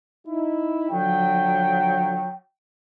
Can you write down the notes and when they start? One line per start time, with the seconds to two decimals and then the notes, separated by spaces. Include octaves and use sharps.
0.28 D#4 E4
0.90 D3 F3 F#3 G5